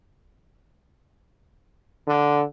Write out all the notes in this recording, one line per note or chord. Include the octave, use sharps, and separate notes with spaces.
D3